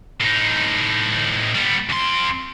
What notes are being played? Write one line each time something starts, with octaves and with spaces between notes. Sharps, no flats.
A2 D#4
G3 B3
F2 C6